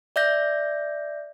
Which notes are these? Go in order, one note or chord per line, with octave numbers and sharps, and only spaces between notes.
D5 E5 G6 A#6